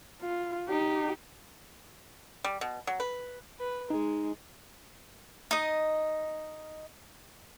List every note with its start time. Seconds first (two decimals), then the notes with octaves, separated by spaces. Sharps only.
0.21 F4
0.69 D#4 G4
2.44 G3
2.61 B2
2.87 F#3
3.00 B4
3.59 B4
3.90 G#3 D#4 G#4
5.51 D#4 D#5